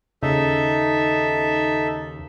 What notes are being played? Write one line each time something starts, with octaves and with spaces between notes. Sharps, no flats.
D#2 C#3 D#4 A4 E5